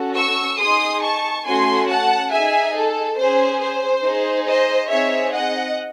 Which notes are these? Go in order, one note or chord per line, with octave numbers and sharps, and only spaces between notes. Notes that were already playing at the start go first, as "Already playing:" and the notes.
Already playing: C#4 F#4 A4
C#6 E6
D#4 G#4 C6 D#6
A5 C#6
A3 C#4 F#4 A4 G#5 C6
F#5 A5
D#4 G#4 E5 G#5
A4
C#4 G#4 C5
C5
D#4 G#4
C5 D#5
C4 D#4 G#4 C#5 E5
D#5 F#5